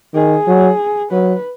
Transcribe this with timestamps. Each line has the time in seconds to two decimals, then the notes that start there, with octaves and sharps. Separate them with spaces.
0.14 D#3 G#4
0.47 F#3
1.12 F#3 B4